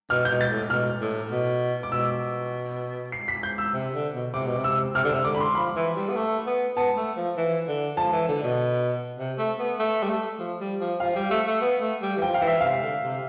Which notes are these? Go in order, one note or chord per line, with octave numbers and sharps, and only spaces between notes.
B2 F6
G6
B2
A6
A2
B2 F6
A2
B2
D6
B2 E6
C7
B6
G6
E6
C3
D3
B2
C3 D6
B2
C3
E6
C3 F6
D3
E6
C3
D3 D6
B5
C6
F3 B5
E3
G3
B3
A3
B3
B3 A5
A3
F3
E3
D3
F3 A5
E3
D3
B2
C3
A3
B3
A3
G3
A3
F3
G3
F3
F3 F5
G3
A3
A3
B3
A3
G3
E3
F3 G5
F5
E3
E5
C3 F5
D3
C3